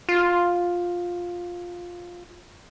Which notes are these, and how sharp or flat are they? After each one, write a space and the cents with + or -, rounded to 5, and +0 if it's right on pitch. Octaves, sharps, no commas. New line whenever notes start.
F4 +10